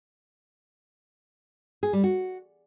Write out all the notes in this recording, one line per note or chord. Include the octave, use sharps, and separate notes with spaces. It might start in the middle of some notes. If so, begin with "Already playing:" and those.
G#4
G3
F#4